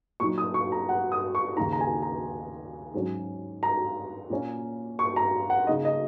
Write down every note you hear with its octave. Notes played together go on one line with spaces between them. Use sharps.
A#2 F#3 D#4 C#6
D#6
C#6
A#5
F#5
D#6
C#6
D#2 C#3 A#3 D#4 A#5
A#5
G#5
A#5
G#2 F#3 C#4
A#5
A#2 A#3 C#4
C#6
A#5
F#5
C#3 A#3 D#4 D#5
D#5